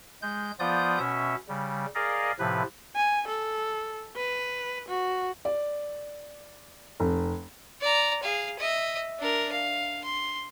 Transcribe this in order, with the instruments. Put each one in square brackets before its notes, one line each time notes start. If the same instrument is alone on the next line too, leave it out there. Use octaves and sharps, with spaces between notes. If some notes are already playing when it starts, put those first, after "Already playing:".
[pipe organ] G#3 G6
F3 B3 F4 D5 D#6 G6
B2 C#4 E5
C#3 G3
G#4 A#4 D5 D#5 F5
A2 C3 F3 B4
[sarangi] G#5
A4
B4
F#4
[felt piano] D5
F1
[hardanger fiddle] D5 A#5
G#4 F5
D#5 E5
D4 A#4
F5
C6